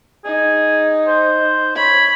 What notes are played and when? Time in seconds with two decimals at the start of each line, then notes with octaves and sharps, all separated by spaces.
0.25 D#4 G#4
1.07 C5
1.75 C#5 B5